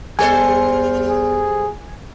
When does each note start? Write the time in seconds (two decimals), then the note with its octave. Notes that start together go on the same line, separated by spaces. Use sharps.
0.19 E2 G3 A4 C5 G#5
1.09 G#4